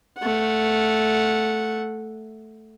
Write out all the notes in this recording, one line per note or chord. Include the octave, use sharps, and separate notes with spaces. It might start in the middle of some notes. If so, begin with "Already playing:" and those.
A3 F#5